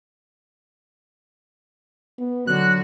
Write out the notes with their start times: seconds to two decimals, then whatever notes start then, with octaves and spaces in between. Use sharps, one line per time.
2.18 B3
2.47 D3 F#3 F#4 F#6